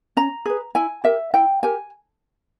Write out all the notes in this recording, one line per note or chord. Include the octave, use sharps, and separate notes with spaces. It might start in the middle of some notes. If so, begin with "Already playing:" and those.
C#4 A#5
G#4 B4
E4 G#5
G4 A#4 E5
E4 G5
G4 A#4 G#5